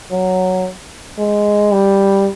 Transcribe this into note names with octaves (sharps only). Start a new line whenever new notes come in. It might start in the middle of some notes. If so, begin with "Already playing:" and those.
F#3
G#3
G3